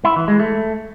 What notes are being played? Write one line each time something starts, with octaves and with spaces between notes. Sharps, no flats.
E4
E3
G#3
A3